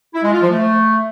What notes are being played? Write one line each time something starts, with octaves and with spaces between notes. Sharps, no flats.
E4
G#3
F4
F3
A3